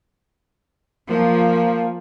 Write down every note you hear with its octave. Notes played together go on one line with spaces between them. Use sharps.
F3 A#3